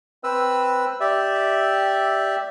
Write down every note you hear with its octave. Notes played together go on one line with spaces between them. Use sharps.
C4 B4 E6
G4 D5 E5